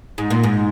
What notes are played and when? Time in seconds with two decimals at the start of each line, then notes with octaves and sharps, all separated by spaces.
0.18 G#2
0.30 A#2
0.44 G#2